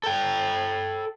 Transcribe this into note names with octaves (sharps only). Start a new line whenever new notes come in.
A4 G5